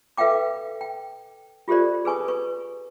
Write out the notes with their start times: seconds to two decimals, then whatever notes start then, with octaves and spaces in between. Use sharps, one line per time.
0.17 A4 B4 E5 F5 G5 D6
0.81 G5
1.68 F4 G4 A4 C5 D5
2.05 G#4 B4 G#5 C#6 D#6
2.28 B4 C#6